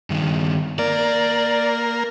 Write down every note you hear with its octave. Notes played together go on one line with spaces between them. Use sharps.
G2 D#3
A#3 A#4 D5